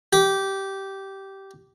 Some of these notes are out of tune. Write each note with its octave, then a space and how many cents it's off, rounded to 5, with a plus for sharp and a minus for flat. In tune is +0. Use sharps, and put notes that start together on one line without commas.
G4 -15